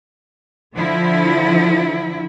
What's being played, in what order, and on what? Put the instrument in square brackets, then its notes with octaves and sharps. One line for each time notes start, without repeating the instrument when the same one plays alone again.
[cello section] D3 F3 E4